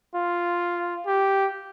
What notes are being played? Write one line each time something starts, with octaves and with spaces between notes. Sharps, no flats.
F4
G4